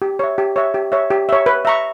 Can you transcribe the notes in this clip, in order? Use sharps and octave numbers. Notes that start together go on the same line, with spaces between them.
G4
C#5 E5
G4
C#5 E5
G4
C#5 E5
G4
C#5 E5
B4
E5 A#5 C#6